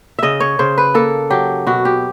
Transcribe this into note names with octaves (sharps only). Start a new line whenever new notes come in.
C#3 D#5 E5
C#5
C#3 C5
B4
A#3 A4
F#3 G4
B2 F#4
G4